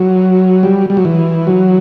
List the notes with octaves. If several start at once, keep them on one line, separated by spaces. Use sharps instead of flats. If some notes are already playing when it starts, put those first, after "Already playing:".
Already playing: F#3
G3
G3
F#3
E3
F#3